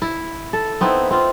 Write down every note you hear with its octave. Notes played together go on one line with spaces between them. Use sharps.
E4
A4
B3 C4 D#4 E4
C4 F4